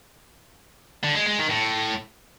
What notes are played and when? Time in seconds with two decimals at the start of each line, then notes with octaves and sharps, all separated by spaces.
1.03 D3
1.15 G#3
1.27 G#3
1.39 D#3
1.51 A2